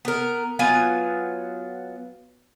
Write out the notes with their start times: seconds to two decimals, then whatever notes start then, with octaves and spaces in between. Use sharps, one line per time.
0.05 B3 A#4
0.59 F#3 B3 F4 G#5